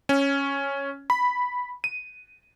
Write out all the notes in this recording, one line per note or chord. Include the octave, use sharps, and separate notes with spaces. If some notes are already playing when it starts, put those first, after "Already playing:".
C#4
B5
D#7